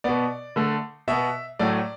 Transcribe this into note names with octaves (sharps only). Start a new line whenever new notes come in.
B2 B3 D5
D3 A3
B2 B3 E5
A2 F#3 A3 D5